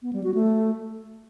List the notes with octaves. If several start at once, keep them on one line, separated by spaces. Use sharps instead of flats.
B3
G3
F#4
A3